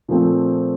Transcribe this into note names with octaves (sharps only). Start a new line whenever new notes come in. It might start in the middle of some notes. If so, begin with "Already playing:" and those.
A#2 F3 A3 C4